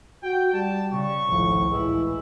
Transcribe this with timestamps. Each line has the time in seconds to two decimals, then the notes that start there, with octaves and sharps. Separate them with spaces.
0.23 F#4 G5
0.53 G3 A5
0.91 C#3 C#6
1.28 G#1 C#2 A2 F3
1.69 A1 E3 G#3 E4